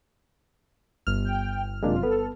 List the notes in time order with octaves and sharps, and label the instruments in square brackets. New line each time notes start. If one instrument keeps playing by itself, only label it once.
[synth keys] G1 F6
[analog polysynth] G5
[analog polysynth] F#2 C3 F4 [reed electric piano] G#3 A#3 D4
[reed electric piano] B3 B4 [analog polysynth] A4